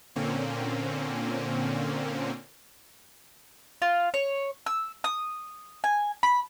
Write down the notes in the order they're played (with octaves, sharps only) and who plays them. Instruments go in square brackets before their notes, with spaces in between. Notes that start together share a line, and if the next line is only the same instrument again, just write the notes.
[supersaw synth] A#2 D3 A#3 C4 C#4
[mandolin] F4
C#5
E6
D#6
G#5
B5